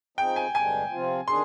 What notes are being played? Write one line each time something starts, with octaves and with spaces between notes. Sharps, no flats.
F3 C4 D#4 G#4 G5
G#5
G2 D3 G#3 D4 G#5
C3 F3 C4 F4
D#3 D4 G#4 C6